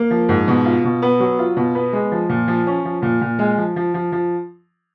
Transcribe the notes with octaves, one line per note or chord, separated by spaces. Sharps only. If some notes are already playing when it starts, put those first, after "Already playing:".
Already playing: A#3
F3
G#2
B2
F4
B2
B3
F#3
F4
B2
B3
G#3
F3
A#2
F3
C#4
F3
A#2
A#2
G#3
F3
F3
F3
F3